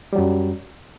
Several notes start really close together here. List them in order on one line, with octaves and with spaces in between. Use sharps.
G3 F#3 F#2